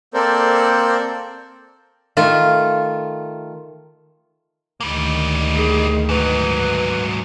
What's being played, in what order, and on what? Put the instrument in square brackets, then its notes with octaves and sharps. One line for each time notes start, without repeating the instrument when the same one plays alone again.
[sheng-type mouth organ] A#3 C4 A4 A#4 C5 D5
[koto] D#3 A3 F4
[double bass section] D2 D#3 [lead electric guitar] G3 A#3
[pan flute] G#4
[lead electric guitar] G#2 F#3 [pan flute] B4